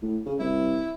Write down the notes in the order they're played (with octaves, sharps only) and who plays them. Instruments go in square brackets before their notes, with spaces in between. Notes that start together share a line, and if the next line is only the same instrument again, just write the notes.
[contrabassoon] A2
C#3
[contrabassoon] C2 [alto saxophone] E4